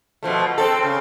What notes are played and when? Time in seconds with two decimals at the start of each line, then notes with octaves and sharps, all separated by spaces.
0.23 B2 F3 A3
0.58 C4 A4
0.83 C#3